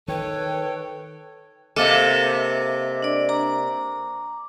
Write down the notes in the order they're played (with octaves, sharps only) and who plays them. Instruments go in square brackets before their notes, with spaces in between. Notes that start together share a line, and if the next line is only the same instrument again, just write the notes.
[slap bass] D#3 [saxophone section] A4 C#5 [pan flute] B4 [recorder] G5
[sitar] C3 A#3 A4 [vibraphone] D#5 E5 D6
[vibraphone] D4 D5
A#5 D6